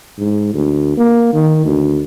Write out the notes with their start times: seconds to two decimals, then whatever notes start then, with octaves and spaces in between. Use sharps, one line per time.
0.19 G#2
0.53 D2
0.97 A#3
1.33 D#3
1.65 D2